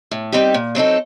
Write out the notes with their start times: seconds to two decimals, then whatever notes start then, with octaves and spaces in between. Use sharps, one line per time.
0.11 A2
0.32 G3 C4 D#4 G4
0.54 A#2
0.75 F#3 C4 D#4 A4